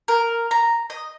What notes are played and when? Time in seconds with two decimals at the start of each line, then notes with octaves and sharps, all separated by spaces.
0.08 A#4
0.51 A#5
0.90 D#5